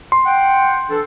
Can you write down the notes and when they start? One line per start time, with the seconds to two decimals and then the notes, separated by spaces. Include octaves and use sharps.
0.12 C6
0.25 F#5 G5
0.89 E3 D4 A4